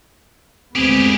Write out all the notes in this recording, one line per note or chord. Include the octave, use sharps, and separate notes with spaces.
D2 G#3 B3 C4 G4 G#4